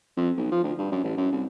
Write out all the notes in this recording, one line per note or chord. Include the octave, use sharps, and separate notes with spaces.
F2
B1
F3
D2
G2
F#2
A1
F#2
C2